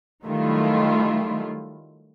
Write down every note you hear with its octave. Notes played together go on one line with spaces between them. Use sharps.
D#3 F#3 G3 A3 E4 F4